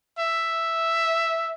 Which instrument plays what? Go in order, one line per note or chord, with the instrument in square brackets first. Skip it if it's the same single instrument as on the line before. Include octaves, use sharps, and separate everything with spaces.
[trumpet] E5